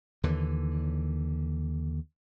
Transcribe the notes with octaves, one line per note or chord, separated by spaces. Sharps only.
D#2 D3 E3